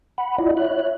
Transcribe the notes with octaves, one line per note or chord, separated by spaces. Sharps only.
F#5 B5
E4 F4 D5 D#5
C#5 E5 F#6